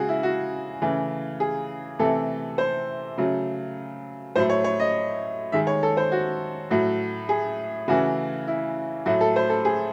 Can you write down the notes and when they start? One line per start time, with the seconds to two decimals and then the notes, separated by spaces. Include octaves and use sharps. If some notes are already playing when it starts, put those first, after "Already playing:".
Already playing: C#3 G#3 F#4 G#4
0.09 E4
0.23 F#4
0.82 C#3 E3 A3
1.40 G#4
1.99 C3 E3 A3 A4
2.58 C5
3.18 C#3 F#3 A3
4.36 A2 F#3 A3 C5
4.50 C#5
4.64 C#5
4.80 D#5
5.52 D#3 G#3 E5
5.67 C#5
5.83 A4
5.97 C5
6.12 F#4
6.70 A2 F#3 A3 F#4
7.29 G#4
7.88 C#3 E3 A3 F#4
8.47 E4
9.06 A2 F#3 A3 F#4
9.21 A4
9.36 C5
9.50 A4
9.65 G#4